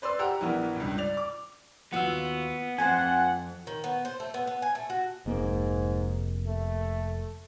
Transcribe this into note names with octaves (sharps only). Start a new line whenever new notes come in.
B4 C5 D5 C6 E6
G4 F#5 A#5 E6
A#1 E3 B3 A#4
C#2 G2
D5 F7
D6
D#2 B3 F4 F#4 F#5 E6
F2 A3 F4 C5 F#5 G#5
D#3
B3
C5
A3
B3
B3
G#5
A3
F#4
F1 G#2 A#3
A3